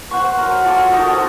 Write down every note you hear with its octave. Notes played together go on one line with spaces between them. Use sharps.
C5 F#5 C6 C#6
F#3 A#4
F4 A4 C#5 D6
D#4 F#4 A#4
C4 A4 C5 G#5